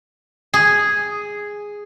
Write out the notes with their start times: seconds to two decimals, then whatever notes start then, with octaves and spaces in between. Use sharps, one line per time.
0.54 G#4